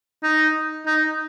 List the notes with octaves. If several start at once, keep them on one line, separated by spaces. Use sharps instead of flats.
D#4
D#4